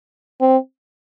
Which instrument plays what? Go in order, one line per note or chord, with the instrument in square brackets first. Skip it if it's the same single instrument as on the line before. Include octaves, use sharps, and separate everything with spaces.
[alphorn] C4